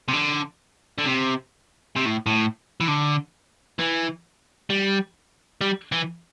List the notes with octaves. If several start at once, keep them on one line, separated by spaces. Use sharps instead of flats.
C3
D3
D3
C3
C3
A2
A2
E3
D3
E3
G3
G3
E3